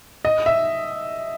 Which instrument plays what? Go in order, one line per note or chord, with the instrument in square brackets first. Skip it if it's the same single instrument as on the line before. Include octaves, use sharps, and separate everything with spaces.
[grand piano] D#5
E5